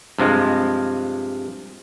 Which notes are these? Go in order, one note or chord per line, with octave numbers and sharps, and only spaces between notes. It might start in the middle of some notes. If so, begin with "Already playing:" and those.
G2 C3 F3 G#3